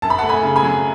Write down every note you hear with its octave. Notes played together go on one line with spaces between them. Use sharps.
F#2 A5
B5
F#5 A5
A3
G#5 B5
C#3
G#5 B5
F#3